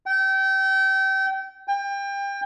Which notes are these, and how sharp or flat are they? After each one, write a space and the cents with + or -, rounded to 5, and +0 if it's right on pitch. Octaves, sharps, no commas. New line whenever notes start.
G5 -30
G5 +30